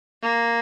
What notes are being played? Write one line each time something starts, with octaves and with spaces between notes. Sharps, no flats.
A#3